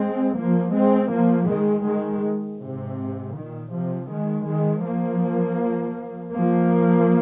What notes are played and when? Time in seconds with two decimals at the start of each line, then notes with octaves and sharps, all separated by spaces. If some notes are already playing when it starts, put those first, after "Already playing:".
Already playing: G#3 C4
0.37 F3 A#3
0.74 G#3 C4
1.11 F3 A#3
1.49 D#3 G#3
1.86 D#3 G#3
2.61 G#2 C3
3.35 A#2 D#3
3.73 C3 F3
4.10 D#3 G#3
4.47 D#3 G#3
4.84 F3 A#3
6.33 F3 A#3